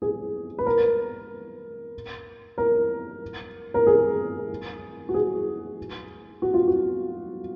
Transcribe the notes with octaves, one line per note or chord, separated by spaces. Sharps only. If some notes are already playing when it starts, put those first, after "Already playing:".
G#4
B4
A#4
A#4
A#4
G#4
F#4
G#4
F#4
F4
F#4